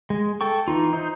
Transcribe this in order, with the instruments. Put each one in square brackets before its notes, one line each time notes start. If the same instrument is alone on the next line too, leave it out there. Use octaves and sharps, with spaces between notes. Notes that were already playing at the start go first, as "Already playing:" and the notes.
[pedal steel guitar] G#3
A4 G5 C#6
E3 D#4 F4
D#4 C5